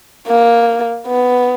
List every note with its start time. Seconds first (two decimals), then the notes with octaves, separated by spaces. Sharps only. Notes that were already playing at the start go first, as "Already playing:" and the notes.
0.27 A#3
1.07 B3